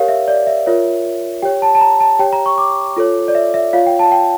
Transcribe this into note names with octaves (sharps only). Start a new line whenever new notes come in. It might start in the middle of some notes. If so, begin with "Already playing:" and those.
Already playing: G4 A#4 C#5 F5
E5
D5
E5
F4 A#4 C#5
G4 C#5 G5
A5
A5
A#5
A5
G4 C#5 G5
A#5
C#6
D6
F4 A4 C#5
D5
E5
E5
F4 C#5 F5
G5
A5
G5